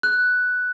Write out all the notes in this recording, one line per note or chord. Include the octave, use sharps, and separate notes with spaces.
F#6